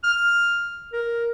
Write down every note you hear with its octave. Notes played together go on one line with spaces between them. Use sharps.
F6
A#4